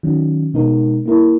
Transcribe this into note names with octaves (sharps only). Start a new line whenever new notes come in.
D#3 F#3 C#4
B2 G#3 D#4 A#4
A#3 E4 A#4